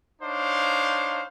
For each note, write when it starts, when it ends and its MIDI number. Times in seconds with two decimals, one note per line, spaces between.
0.22 1.24 62
0.22 1.24 63
0.22 1.24 72
0.22 1.24 73
0.22 1.24 77